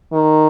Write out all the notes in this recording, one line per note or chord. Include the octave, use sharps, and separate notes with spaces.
D#3